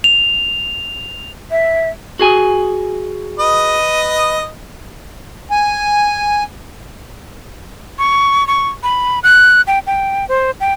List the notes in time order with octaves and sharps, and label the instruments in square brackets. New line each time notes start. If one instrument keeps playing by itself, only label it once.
[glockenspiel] F7
[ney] E5
[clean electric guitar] F#4 G#4 G#5
[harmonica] B4 D#5 D#6
[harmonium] G#5
[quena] C#6
C#6
B5
F#6
G5
G5
C5
G5